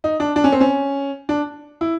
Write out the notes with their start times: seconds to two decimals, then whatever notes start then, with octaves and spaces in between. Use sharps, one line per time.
0.04 D#4
0.20 D4
0.36 D4
0.44 C#4
0.52 C4
0.61 C#4
1.29 D4
1.81 E4